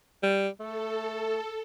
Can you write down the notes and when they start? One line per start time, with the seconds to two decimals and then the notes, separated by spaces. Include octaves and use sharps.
0.23 G3
0.60 A3 A4